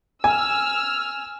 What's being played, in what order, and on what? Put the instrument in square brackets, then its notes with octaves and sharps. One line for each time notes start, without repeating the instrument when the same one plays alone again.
[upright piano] G#5 [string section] E6 F6